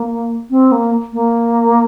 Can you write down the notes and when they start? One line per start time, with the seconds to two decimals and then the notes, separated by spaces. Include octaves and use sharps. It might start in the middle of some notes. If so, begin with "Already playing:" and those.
Already playing: A#3
0.51 C4
0.72 A#3
1.13 A#3